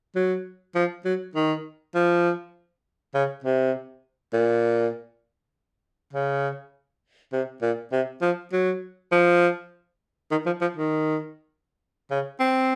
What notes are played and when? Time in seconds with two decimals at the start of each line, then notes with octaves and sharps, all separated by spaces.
0.15 F#3
0.75 F3
1.05 F#3
1.35 D#3
1.95 F3
3.14 C#3
3.44 C3
4.33 A#2
6.13 C#3
7.33 C3
7.62 A#2
7.92 C3
8.22 F3
8.52 F#3
9.12 F3
10.31 D#3
10.46 F3
10.61 F3
10.77 D#3
12.10 C#3
12.40 C4